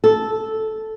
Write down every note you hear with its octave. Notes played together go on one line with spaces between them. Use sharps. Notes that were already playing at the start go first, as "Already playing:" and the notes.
A4